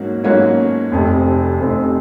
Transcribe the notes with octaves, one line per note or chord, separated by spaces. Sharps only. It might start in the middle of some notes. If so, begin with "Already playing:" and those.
Already playing: G#2 F#3 A#3 C#4 F#4
G#2 F#3 A#3 C#4 F#4
F1 F2 C3
F1 F2 C3